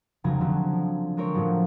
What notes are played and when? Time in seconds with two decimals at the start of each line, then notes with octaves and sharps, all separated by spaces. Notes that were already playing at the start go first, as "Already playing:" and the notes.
0.24 F1 C#2 C#3 F#3 G#5 A#5
0.41 D3 F#3 C4
0.72 F3
1.17 G#3 C4 A#4 C#5
1.35 A2 D3 F3 F#3